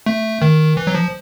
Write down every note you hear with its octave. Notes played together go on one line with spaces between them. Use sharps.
A3
D#3
E3
F#3
F3